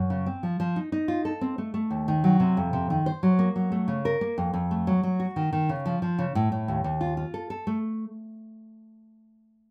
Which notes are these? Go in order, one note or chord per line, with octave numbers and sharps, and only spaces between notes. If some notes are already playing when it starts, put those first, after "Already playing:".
Already playing: F#2
C#3
C4
F3
F3
D#4
D#4
F4
A4
C4
A3
A3
D#2
D#3
F#3
C3
F2
C3
D#3
C5
F#3
A#3
F#3
A3
C#3
A#4
A#3
F2
F2
A3
F#3
F#3
F#4
D#3
D#3
C#3
F3
F3
C#3
A2
A2
D#2
D#2
F4
F4
A4
A4
A3